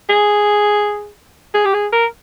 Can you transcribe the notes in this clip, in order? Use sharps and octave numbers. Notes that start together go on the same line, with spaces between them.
G#4
G#4
G4
G#4
A#4